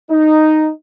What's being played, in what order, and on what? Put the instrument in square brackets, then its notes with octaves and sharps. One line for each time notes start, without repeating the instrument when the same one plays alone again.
[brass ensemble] D#4